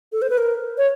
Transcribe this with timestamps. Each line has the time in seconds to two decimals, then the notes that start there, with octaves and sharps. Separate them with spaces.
0.12 A4
0.22 C5
0.30 B4
0.38 A#4
0.78 C#5